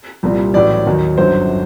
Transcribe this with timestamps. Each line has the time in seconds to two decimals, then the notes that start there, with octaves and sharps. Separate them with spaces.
0.23 C2 A#2 G3
0.54 A1 A2 F#3 D5
0.86 D#2 D#3 F#3
1.18 G1 F#2 F#3 C5